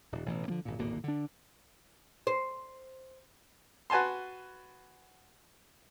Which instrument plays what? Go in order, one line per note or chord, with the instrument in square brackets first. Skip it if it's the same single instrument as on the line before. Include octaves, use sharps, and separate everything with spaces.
[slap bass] D#1
A1 B2 E3
D3 F3 A#3
G#1 A#2
D1 G#1 B2 A#3
D3 D4
[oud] C5
[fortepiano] F#4 B4 G#5 A5 C6